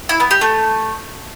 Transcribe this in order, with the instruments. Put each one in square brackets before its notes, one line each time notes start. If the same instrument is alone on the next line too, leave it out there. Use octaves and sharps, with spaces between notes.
[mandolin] E4
B3
G4
A3